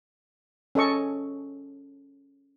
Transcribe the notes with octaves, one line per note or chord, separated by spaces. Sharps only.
C#4 A4 D#5 C#6